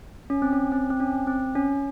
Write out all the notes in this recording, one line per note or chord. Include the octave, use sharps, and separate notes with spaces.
C#4
C4
C#4
C4
C4
C#4
C4
C#4